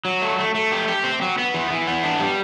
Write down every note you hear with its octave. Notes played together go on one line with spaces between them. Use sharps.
F#3
A3
A3
A3
G4
G4
C4
F#3
B3
E3
E3
B3
D4
G3